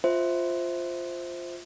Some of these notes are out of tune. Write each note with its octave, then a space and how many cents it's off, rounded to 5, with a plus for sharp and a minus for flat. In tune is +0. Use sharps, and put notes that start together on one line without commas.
F4 +0 C5 +0 E5 -20